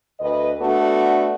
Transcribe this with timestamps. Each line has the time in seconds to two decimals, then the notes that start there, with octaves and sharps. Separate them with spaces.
0.19 D2 B4 D#5
0.60 A3 B3 D4 F#4